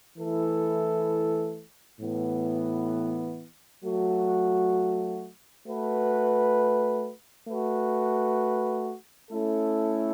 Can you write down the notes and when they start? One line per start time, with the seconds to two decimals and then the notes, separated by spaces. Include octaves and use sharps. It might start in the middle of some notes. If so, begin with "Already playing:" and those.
0.18 E3 A3 E4 A4
2.00 A2 E3 B3
3.83 F#3 A3 F#4
5.66 A3 F#4 B4
7.48 A3 F#4 B4
9.31 A3 C#4 E4 A4